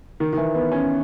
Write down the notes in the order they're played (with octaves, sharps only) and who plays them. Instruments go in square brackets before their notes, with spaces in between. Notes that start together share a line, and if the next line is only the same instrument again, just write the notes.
[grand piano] D#3
D#3
E3
B3
C#4